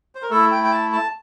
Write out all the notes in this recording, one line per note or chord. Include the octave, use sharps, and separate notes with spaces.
C5
A#4
A3 E4 A4
G5
G5
A5
A5